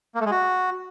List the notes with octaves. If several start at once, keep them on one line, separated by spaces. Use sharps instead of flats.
A#3
A3
G#3
F#4